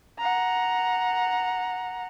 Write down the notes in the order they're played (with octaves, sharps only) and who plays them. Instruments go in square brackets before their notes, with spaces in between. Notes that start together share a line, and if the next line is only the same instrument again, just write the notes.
[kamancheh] F#5 A#5